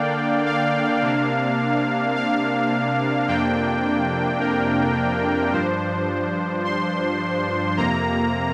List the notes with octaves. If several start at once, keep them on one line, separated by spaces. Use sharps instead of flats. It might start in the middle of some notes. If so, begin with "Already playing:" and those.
Already playing: D3 A#3 D4 D5 F5 G5
F5
C3 A#3 D4
F5
F2 C3 A#3 D4 G5
A#4
G2 F3 D4 C5
C6
F2 C3 A#3 A#5